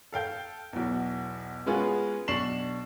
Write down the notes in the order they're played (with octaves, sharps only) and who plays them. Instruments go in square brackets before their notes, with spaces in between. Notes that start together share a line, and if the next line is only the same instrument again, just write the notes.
[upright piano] A4 F5 G5 G6
B1 E2
G#3 B3 C#4 F4 F#4 G#4
B1 D4 C#6 C7 E7 F#7